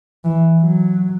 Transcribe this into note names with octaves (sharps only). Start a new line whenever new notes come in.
E3
F#3